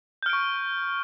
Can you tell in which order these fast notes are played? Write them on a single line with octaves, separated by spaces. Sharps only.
G6 F6 D7 C#6